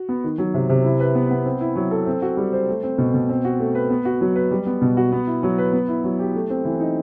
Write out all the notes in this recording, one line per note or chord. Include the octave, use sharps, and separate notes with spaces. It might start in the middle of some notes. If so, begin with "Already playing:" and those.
Already playing: F#4
B3
D#3
F#3
C3
C3
E4
B4
B3
B3
C4
E4
F#3
A4
C4
F#4
G3
C5
A3
C4
B2
B2
C4
F#4
A3
B4
B3
F#4
F#3
B4
G3
B3
B2
F#4
B3
E4
F#3
B4
B3
E4
F#3
G4
A3
C4
E3
D#4